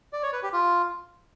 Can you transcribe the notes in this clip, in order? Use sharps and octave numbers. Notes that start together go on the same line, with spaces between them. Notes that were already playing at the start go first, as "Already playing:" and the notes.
D5
C#5
B4
G4
F4